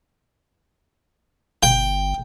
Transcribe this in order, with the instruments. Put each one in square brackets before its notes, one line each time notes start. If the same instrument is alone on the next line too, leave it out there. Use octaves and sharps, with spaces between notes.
[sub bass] G1 [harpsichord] G5